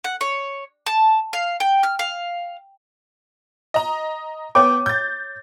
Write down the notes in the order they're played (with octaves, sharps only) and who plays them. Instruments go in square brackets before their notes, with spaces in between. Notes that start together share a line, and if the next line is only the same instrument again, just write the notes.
[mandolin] F#5
C#5
A5
F5
G5
F6
F5
[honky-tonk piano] D#5 A#5
[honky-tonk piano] B3 G5 [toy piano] C#5 D6
[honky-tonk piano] G6 A6